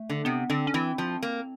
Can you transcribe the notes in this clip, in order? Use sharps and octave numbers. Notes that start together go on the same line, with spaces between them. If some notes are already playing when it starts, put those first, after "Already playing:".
Already playing: A3
D3
C3 B3
D3 C4
C#4
E3 C4
F3
A#3